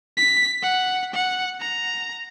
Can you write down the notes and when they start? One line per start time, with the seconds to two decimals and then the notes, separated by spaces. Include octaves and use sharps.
0.18 B6
0.63 F#5
1.15 F#5
1.61 A#5